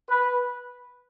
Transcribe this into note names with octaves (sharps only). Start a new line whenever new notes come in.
B4